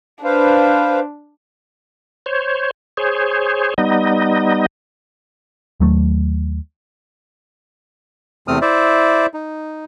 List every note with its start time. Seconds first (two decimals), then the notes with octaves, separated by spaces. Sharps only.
0.24 D4 B4 C5 F5
2.26 C5 C#5
2.97 G#4 C5 C#5
3.78 G3 B3 D#4 D#5
5.80 D#2 F#3 A3
8.48 E2 C3 A3 C4 D#6 F6
8.62 E4 C5 D5 E5
9.34 D#4